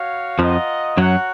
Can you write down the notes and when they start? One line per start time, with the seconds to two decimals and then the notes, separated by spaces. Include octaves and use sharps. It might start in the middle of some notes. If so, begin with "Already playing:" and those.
Already playing: F#4 C#5 F5
0.39 F2 F3 F4 A#4 D#5 F#5
0.97 F#2 F#3 F#4 A#4 C#5 F#5